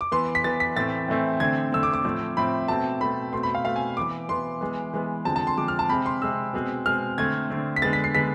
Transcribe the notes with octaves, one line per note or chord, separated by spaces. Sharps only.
D6
E3 B3 C6
B6
E3 B3 A6
B6
A2 E3 A3 C4 A6
A2 E3 A3 C4
D3 A3 C4 G#6
D3 A3 C4 E6
D6
D6
A2 F3 A3 C4
A2 F3 A3 C4 B5
B2 A3 C4 A5
B2 A3 C4 B5
B2 A3 C4 C6
B5
F5
B2 A3 C4 F5
G#5
E3 B3 D6
E3 B3 C6
E3 G#3 B3
E3 G#3 B3
D3 F3 G#3 C4 A5
A5
C6
D3 F3 G#3 C4 D6
F6
A5
C3 G#3 C4 B5
C6
C3 G#3 C4 E6
B2 G#3 C4
B2 G#3 C4 F6
D3 A3 C4 G#6
D3 A3 C4
B6
D3 G#3 B3 A6
B6
C7
D3 G#3 B3 B6